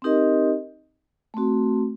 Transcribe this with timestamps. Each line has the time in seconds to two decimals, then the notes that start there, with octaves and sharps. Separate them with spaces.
0.02 C4 D#4 G4 A#4 D#5
1.34 A3 C4 F#4